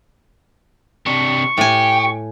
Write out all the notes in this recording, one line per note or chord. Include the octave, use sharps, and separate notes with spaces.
C3 D4 C#6
A2 G4 G#5